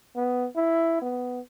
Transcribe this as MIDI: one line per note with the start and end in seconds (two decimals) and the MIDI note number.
0.16 0.46 59
0.56 1.00 64
1.01 1.40 59